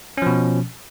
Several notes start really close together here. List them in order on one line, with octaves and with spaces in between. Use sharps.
C#4 F3 B2